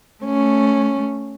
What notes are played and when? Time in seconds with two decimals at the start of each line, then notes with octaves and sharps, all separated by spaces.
0.24 A3 C#4